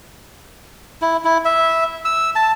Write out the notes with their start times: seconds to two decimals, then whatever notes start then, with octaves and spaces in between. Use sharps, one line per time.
1.02 E4
1.25 E4
1.45 E5
2.05 E6
2.36 A5